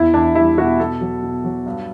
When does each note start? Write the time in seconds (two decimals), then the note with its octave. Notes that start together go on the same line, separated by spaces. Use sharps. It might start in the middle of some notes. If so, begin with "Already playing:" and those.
Already playing: E2 E3 E4
0.14 E2 D4
0.35 G3 E4
0.58 B2 F#4
0.79 B2 A4
1.01 F#3
1.22 B2
1.44 F#3
1.66 G2